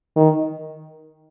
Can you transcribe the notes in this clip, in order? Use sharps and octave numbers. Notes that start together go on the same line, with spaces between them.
D#3